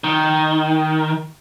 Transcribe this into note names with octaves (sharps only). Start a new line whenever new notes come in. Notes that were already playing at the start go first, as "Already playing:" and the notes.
D#3